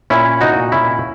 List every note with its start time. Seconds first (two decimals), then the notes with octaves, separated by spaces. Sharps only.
0.10 A#2 C#4 E4
0.41 D#4 F#4
0.57 A#2
0.72 C#4 E4